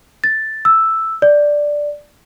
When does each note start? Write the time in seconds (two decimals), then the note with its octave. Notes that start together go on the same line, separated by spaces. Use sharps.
0.24 A6
0.65 E6
1.22 D5